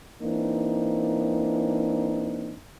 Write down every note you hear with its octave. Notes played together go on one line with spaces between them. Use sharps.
E3 A#3 C4 D4 D#4